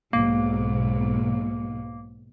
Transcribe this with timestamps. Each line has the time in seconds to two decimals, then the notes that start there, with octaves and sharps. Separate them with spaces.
0.13 B1 G#2 A#3